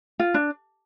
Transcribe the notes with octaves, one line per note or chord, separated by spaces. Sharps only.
F4
D4